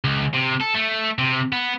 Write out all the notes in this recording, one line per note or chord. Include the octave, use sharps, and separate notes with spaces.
C#2
C3
A4
A3
C3
B3